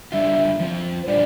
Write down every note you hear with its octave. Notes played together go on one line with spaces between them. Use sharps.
D3 G3 D4 F4 E5
F3 C4 F4
C5
A#2 G3 D4 F4 D5